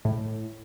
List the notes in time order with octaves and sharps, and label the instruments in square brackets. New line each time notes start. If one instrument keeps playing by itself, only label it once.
[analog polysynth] A2